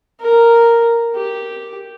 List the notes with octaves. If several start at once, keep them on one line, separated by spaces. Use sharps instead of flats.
A#4
G4